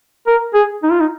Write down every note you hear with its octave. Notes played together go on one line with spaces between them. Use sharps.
A#4
G#4
D#4
F4
D#4